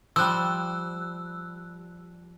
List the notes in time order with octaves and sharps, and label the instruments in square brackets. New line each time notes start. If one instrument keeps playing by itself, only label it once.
[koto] F3 G3 [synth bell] E6 F#6